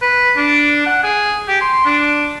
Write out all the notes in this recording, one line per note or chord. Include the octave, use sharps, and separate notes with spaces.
B4
D4
F#5
G#4
G4
C6
D4